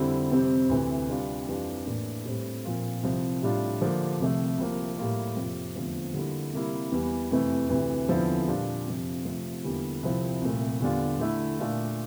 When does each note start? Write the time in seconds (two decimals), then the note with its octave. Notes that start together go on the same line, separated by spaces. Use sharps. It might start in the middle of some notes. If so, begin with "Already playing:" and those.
Already playing: F2 D3 G3 C4 E4
0.31 F2 C3 G3 C4
0.69 D2 C3 E3
1.09 C3 G3 D4 F4
1.48 F2 E3 G3 D4 F4
1.87 A2 E3 A#3 D4
2.26 A2 G3 C4
2.65 A#2 F3 C4 F4
3.03 C2 C3 F3
3.43 A2 G3 D4 F4
3.81 D3 F3 A#3 D4
4.20 C2 C3 F3 A3
4.58 C2 C3 F3 A#3
4.98 A2 G3 A#3 F4
5.36 F2 C3 F3 A#3 F4
5.75 E2 D3 F3 A3 C4
6.14 D3 G3 A#3 E4
6.53 C3 G3 A#3 E4
6.92 E2 E3 G3
7.31 F2 C3 E3 A3
7.70 D2 C3 E3
8.09 E2 D3 F3 C4 E4
8.48 A#2 G3 D4 F4
8.86 F2 C3 F3
9.25 C3 F3 A3
9.64 E2 D3 G3 A#3 E4
10.03 C2 C3 F3 C4 E4
10.42 C2 A#2 A3
10.80 E2 D3 G3 D4 F4
11.19 D3 A3 E4
11.58 A#2 A3 D4 F4